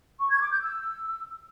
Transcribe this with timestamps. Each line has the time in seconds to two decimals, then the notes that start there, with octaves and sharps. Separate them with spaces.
0.19 C#6
0.30 G#6
0.40 D6
0.51 G6
0.61 E6